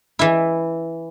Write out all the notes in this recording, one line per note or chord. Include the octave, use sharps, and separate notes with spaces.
E3 E4